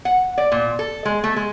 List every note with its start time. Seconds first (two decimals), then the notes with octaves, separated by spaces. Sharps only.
0.05 F#5
0.38 D5
0.52 A#2
0.79 A4
1.05 G#3
1.24 A3
1.36 G#3